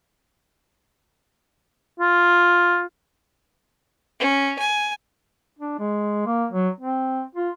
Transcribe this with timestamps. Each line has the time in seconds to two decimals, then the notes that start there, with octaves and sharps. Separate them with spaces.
2.00 F4
4.20 C#4
4.59 G#5
5.59 D4
5.79 G#3
6.26 A#3
6.51 F#3
6.80 C4
7.35 F4